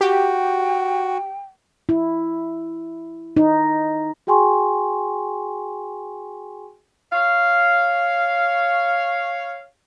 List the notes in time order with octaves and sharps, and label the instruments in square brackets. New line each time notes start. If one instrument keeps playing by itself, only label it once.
[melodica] F#4 [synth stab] G4 [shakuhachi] G5
[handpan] E4
D#4
[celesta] F#4 G#4 G5 G#5 C6 C#6
[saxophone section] C#5 F5